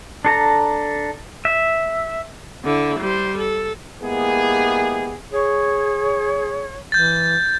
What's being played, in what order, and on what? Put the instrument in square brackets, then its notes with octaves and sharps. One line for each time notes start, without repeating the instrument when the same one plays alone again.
[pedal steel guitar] D4 A4 A#5
E5
[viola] D3 E4
G3 C5
A4
[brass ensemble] G#3 A#3 B3 E4 G4 G#4
[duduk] G#4 [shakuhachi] C#5
[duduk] E3 [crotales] G6 A6